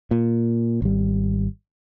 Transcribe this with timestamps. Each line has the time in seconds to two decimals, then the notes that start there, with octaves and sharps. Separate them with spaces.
0.11 A#2
0.82 G#1 G3